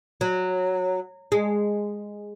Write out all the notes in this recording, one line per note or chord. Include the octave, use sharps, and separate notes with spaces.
F#3
G#3